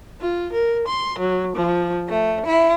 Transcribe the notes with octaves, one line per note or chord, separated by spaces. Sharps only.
F4
A#4
C6
F#3
F3
A3
E4